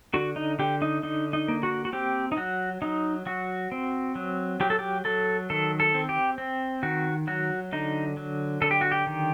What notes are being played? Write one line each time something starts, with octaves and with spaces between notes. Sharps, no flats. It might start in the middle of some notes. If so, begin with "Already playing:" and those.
D3 F#4
D#4
D3 G4
D#4
D3 D#4
D#4
A#3
F#4
F#4
C4 G4
D#4
F#3 F#4
F#3 D#4
F#3 F#4
C4
F#3
F#3 G4
A4
G4
F#3 A4
D#3 A4
A4
C4
G4
C4
D#3 F#4
F#3 F#4
D3 D#4
F#3
D3 A4
G4
F#4
G4
D#3